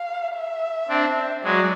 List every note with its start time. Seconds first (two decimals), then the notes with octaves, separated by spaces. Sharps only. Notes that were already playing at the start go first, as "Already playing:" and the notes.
Already playing: F5
0.35 E5
0.89 C4 D4
1.44 F#3 G#3 D5